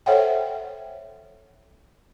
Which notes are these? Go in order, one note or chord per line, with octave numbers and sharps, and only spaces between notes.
A4 C5 C#5 E5 F#5 G5